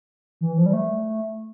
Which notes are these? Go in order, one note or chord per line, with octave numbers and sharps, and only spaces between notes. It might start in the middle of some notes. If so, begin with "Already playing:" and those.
E3
F3
G3
A3